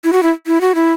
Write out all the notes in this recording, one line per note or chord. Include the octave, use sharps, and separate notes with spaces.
E4
F#4
E4
E4
F#4
E4